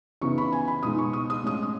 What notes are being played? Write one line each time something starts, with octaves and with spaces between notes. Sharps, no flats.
C#3 E3 B3 D#4 C#6
B5
G#5
B5
B2 G#3 D#4 D#6
C#6
D#6
D#6
A2 G#3 C#4 D#6
D#6